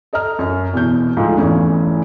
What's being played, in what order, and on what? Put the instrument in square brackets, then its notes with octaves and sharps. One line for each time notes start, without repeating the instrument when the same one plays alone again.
[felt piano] A4 D#5 A#5 F6
F#2
E2 B2 G6
D2 G#2 F3
F1 E2 E3 C#4